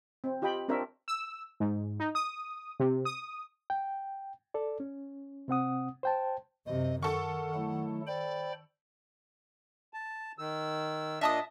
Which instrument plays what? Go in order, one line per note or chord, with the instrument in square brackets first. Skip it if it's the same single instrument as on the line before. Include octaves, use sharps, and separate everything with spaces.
[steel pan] C4
F4 G4 D#5 G5 B5
C4 D4 F4 A#4 C#5 E5
[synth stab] E6
G#2
D#4
D#6
C3
D#6
[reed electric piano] G5
A4 D5
C#4
C3 C4 F#5 D#6
C5 G5 A5
[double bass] F#2 C3 [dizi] D#5
[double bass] D#3 [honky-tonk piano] A4 C#6 [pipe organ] A#4 [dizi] F#5
[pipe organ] F#3 A3 E4
[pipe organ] C5 G5 B5 [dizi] D5
[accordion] A5
D#3 E6
[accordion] A#2 D4 D#5 [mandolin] E5 A5 D#6